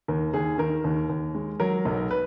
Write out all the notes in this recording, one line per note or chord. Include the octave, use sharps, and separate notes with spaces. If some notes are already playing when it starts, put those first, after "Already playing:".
D#2 A#4
D#2 G#4
D#3 A#4
D#2
D#2
G#3
F#3 A#4
B1
B4